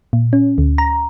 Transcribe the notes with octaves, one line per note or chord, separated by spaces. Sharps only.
A#2
C#4
D2
A#5